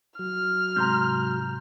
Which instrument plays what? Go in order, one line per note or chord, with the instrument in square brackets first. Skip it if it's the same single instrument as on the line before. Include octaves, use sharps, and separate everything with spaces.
[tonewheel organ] F#3 [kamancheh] F6
[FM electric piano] G#2 C3 [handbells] A#5 C6 G6